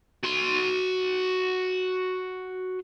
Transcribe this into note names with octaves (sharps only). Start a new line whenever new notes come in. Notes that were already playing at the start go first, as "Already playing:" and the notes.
F#4 C6